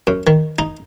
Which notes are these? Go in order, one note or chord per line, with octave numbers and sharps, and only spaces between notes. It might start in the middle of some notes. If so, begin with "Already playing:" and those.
F#2
D#3
D#4